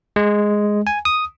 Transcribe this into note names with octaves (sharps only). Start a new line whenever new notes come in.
G#3
G#5
D#6